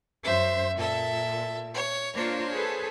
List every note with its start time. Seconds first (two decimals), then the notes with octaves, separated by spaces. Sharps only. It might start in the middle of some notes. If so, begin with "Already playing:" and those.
0.25 F#2 C5 E5
0.78 A#2 A4 E5
1.74 C#5
2.14 A#3 D4 F4 C5 C#5
2.54 G#4 A4 B4